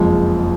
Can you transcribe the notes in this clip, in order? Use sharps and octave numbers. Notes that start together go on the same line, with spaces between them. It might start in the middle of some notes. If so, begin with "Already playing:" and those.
Already playing: F#1 F2 F3 G#3